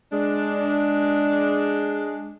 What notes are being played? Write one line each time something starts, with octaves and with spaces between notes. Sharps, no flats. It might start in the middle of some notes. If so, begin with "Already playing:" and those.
G#3 D4